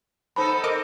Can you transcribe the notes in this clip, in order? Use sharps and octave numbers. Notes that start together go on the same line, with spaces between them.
B3 D#4 A4 C5 A5 B5
C4 A#4 D#5 D6